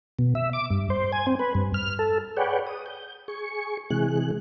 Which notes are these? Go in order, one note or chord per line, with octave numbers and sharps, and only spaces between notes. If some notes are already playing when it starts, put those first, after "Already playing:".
B2
E5
D6
G2
C5
G#5
C4
B4
G2
F6
A4
G#4 B4 C#5 D5 F#5 G5
D#6
G6
G#4 C#6
C3 E3 G#3 G#4 F#6